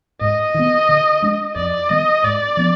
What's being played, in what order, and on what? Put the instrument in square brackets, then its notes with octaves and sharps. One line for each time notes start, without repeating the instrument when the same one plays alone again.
[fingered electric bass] G#2 [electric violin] D#5
[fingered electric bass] D#3 B3
D3
G#3 D4
[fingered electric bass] F2 [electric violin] D5
[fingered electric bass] D#3 G3 B3 [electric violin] D#5
[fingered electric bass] G#2 [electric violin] D5
[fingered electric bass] F3 B3 D4